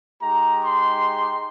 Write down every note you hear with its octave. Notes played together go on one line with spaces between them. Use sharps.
G#3 D#4 G4 A#5
C6